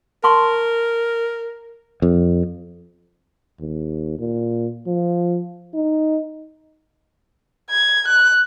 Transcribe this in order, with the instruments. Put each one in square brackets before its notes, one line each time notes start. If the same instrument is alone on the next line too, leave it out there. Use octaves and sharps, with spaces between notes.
[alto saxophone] A#4 [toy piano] A5 C6 C#6
[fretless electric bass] F2
[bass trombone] D#2
A#2
F3
D#4
[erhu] G#6
F#6